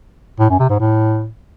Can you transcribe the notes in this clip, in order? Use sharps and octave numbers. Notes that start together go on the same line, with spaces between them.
A2
F#2
C3
G#2
A2